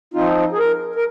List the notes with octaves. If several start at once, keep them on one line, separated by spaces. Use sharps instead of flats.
F3 C4 D#4 F4
G#4
A#4
A#4